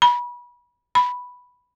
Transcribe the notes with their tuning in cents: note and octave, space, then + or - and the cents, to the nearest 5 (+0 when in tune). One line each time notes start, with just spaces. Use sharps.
B5 -30
B5 +0